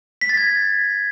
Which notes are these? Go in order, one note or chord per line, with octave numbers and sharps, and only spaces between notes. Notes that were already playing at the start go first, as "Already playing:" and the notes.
B6
A6
G#6